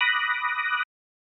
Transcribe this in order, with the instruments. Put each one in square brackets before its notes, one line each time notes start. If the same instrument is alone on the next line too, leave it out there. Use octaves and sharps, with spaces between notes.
[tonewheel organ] B5 D6 D#6 F#6 A#6